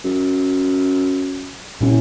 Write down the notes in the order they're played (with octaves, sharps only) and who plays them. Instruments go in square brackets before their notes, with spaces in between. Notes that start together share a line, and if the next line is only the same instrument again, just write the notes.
[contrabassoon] F#2
[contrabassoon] C2 [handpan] A#2 C#4 E4